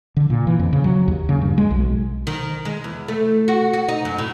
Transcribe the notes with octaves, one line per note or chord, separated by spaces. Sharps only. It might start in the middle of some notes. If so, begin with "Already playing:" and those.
D3
A#2
E3
F2
C#3
F#3
D#2
C#3
G2
G#3
B1
D#3
G#3
E2
A3
F#4
F#4
D#4
F#2
A2